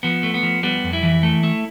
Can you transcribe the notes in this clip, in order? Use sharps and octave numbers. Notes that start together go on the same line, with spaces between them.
F3 B3
A3
B3
F3
G3 B3
F2
E4
E3
A3
A3